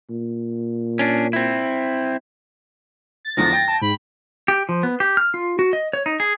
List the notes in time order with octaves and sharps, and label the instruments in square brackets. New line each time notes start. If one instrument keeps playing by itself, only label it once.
[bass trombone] A#2
[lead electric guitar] C#4 D4
C4 E4
[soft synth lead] A6
[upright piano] E2 D3 F3 [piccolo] A#6
[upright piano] G5
[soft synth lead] A5
[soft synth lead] G#2 [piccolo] B5
[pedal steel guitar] G4
F3
B3
G4
F6
F4
F#4
D#5
C#5
D#4
G#4